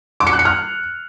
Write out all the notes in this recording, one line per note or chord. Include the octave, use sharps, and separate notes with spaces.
D6
C#7
F#6
C#7
F6